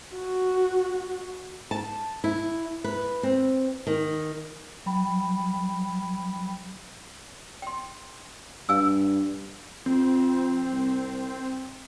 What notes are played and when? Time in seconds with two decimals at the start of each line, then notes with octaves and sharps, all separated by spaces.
0.16 F#4
1.71 A5
2.24 E4
2.84 B4
3.23 C4
3.87 D#3
4.86 F#3 G5 B5
7.62 G5 C6
8.69 G2 F5 G#5 E6
9.86 F2 C4
10.72 C2